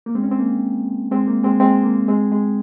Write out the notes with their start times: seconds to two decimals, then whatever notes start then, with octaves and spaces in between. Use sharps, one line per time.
0.06 A#3
0.15 G#3 C4
0.23 C#4
0.31 C4
0.39 A#3
1.11 G#3 C4
1.27 A#3
1.43 G#3 C4
1.60 G#3 C4
1.83 A#3
2.08 G#3 C4
2.32 G#3